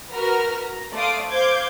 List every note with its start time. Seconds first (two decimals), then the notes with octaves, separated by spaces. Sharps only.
0.11 F#4 A#4 B4 A#5 F6
0.56 A#5
0.93 A3 D5 F5 C6 D#6 D7
1.28 C5 F5 D6 G6 G#6